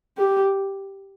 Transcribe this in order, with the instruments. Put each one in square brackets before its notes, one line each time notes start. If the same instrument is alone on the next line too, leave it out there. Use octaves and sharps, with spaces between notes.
[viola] G4